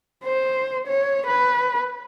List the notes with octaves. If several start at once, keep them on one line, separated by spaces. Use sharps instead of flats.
C5
C#5
B4